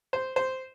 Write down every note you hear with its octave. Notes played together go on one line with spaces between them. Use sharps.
C5
C5